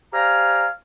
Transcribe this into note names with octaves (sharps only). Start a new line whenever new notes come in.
G4 C5 D5 F5 G#5 A#5